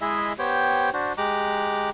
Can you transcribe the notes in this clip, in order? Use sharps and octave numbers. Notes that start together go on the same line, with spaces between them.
G#3 E4 G#4 D#5 E5
B3 G4 C5 C#5 G5
D4 F#4 C5
G#3 G4 A#5 D6 F#6